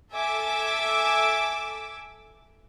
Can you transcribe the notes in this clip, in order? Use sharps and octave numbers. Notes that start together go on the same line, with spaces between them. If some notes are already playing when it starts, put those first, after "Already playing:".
A4 E5 G#5 D6 E6